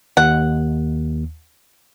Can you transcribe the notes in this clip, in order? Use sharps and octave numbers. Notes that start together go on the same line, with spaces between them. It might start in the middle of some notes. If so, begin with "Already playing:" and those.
D#2 F#5